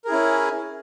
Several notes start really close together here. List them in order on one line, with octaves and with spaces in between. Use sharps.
A#4 G#4 E4 C#4